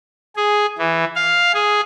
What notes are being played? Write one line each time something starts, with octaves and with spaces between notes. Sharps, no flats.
G#4
E3
F5
G#4